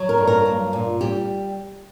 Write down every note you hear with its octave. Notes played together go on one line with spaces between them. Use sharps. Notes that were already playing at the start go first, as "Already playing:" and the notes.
Already playing: F#3
A#4
G2
A#4
A#3
A#2
G3 G4